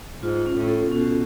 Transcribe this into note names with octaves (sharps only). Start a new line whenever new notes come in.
G#2 F4
C#4
A2
A4
B2 C#4